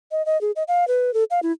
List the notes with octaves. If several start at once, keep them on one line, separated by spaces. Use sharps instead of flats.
D#5
D#5
G#4
D#5
F5
B4
A4
F5
E4